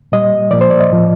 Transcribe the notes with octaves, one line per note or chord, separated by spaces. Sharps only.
A#2 G3 D#5
A#2 F3 D5
C5
D5
D#5
A2 F3